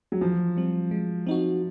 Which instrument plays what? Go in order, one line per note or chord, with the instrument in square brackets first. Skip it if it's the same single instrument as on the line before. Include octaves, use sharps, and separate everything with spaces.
[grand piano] F#3
[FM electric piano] E3 [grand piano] F3
[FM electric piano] G3 C4
G#3
C4 D#4 F#4